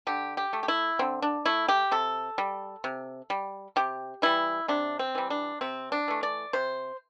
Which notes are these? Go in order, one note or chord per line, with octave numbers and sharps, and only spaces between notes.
D3 G4
G4
A3
G4
E4
D3 C4
D4
A3 E4
G4
C3 A4
G3
C3
G3
C3 G4
E3 G3 E4
C3 D4
C4
E3 G3
D4
C3 C4
D4
E3 A3
D5
C3 C5